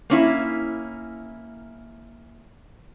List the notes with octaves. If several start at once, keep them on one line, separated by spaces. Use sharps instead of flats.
A#3 C#4 E4